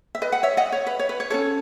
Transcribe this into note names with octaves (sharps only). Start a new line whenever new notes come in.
E5
B4 D#5
F#5
C#5 E5
D#5 F#5
C#5
B4
C#5
B4
C#5
C#4 F#4 A4 C#5